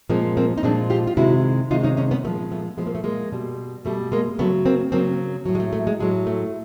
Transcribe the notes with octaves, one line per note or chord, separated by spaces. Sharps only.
A#2 F3 G#3 A#3 C4
A#3 C4
D#4
A#2 F3 G#3 C4 D4
F4 G4
F4
C3 D#3 G#3 E4 F#4
C3 D#3 G#3 D#4 F4
C#4 D#4
C#4 D#4
B3 C#4
A#2 F3 G#3 A3 B3
A3 B3
A#2 F3 G#3 B3
A#3
A3
G#3 A#3
B2 G3
B2 G3 A3
G#3 A#3
C#3 F#3 A3 B3
A#3 C4
C#3 F#3 A#3 C4
A2 F#3
G#3
A3
A3
G#3
A2 F#3 G#3
A3